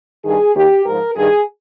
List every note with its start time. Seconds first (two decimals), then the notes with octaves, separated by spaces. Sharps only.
0.25 G2 D#3 G#4
0.56 D#2 D#3 G4
0.85 G#2 F3 A#4
1.15 G2 D#3 G#4